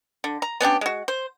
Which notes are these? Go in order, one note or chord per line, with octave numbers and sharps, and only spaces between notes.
D3
A#5
B3 C#4 D4 G4
G#3 F#4
C5